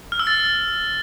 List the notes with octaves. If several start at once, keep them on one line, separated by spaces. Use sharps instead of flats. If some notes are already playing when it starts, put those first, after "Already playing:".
F6
E6
A6